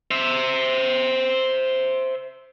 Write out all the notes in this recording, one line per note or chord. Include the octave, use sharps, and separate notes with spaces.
C5 E5